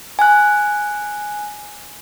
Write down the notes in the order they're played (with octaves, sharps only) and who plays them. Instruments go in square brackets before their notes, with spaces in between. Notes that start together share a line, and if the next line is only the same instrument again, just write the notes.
[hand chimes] G#5 F#6